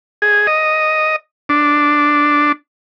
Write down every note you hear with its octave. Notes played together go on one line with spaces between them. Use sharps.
G#4
D#5
D4